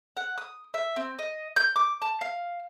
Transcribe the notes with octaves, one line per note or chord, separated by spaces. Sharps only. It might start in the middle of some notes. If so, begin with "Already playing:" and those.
F#5
D#6
E5
C4
D#5
G6
D6
A5
F5